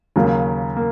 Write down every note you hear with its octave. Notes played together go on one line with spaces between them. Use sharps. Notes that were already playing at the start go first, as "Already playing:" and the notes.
D#2 C#3 F#3 A#3
A#3